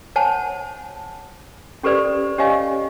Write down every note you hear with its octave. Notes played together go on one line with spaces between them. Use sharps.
C5 C#5 F#5 G#5 A5
C#4 G4 A4 B4 C5 D5
C#4 G4 C#5 D#5 F5 G#5